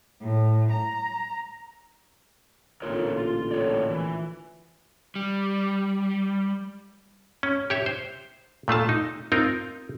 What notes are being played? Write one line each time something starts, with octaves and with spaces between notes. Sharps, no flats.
A2
A#5
A1 A#2 D3 F4 A#4 C#5
F4
A2 C#5 D5
E3
G3
C#4
G4 C#5 E5
C5
A#2 A3 F4 A5
D#4
C4 D#4 F4 A#4